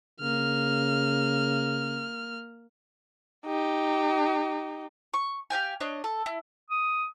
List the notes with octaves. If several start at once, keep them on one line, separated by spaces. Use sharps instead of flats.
C#3 A#3 F6
D#4 G4
C#6
G4 F5 G5 G#5
D4 C#5 D#5
A4
E4
D#6